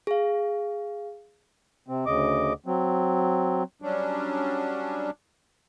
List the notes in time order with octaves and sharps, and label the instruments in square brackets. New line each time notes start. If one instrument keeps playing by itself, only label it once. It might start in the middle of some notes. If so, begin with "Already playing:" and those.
[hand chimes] G#4 F5
[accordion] C3 C4
D2 C#3 D#5 D6
F#3 C4
F#3 G3 C#4 D4